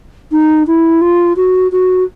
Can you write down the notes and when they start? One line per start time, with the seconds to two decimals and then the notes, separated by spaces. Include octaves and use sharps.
0.32 D#4
0.67 E4
1.01 F4
1.36 F#4
1.72 F#4